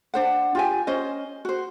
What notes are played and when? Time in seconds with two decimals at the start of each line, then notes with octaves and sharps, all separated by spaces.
0.14 D4 C5 F#5
0.55 F4 G4 G#5
0.87 C#4 C5 D#5
1.45 F#4 C5